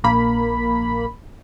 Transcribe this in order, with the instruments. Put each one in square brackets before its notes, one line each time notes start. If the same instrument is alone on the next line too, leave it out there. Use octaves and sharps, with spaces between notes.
[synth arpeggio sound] A#1 A#3 B5